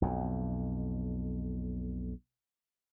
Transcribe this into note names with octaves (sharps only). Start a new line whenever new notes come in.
B1 F2